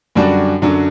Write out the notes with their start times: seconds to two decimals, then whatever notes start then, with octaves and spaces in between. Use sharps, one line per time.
0.15 F#2 D3 G3 D4 F#4
0.62 F#2 D3 F#3